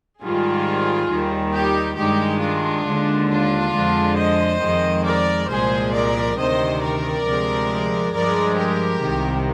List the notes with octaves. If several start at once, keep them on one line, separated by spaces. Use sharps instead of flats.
G#2 D#3 G3 F4 G#4
D#2 D#3 G3
D#4 G4
G2 D#3 G#3 D#4 G4
D4 F4
D#2 D3 G#3
D4 F4
F2 D3 G#3
C5 D#5
F2 D#3 G#3
A#4 D5
C2 A#2 F3 G#3 G#4 C5
A#4 D5
D2 C3 D#3 C5 D#5
A#4 D5
D2 C3 F3 G#3
G2 F3 G#3 A#4 D5
G4 A#4
C2 C3 D#3